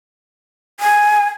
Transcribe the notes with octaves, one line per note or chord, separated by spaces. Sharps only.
G#5